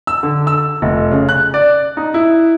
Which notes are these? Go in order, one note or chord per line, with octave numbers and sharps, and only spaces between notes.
E6
D3
E6
F1
C#3
F#6
D5
D#4
E4